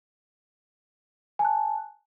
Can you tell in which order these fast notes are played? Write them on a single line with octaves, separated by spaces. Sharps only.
G#5 A5 F#6